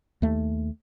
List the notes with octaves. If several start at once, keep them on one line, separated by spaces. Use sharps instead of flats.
D#2 A3